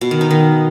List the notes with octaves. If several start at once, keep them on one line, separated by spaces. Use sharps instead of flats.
B2
D#3
D#4
D#3